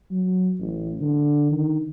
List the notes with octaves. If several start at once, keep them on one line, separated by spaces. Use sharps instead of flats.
F#3
A1
D3
D#3